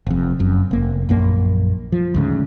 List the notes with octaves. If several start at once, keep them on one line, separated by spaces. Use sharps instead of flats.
F1 F2
F#1 F#2
F1 A#3
A#1 F#2 A#3
F3
D2 G#2 C#3